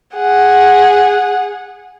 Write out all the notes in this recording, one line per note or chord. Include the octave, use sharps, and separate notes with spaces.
G#4 F#5